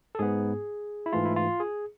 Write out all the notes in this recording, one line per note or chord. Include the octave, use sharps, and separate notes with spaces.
A4
G#2 G#3 B3 G#4
E4
G#2 E3 A3 F4
E4
F4
G#4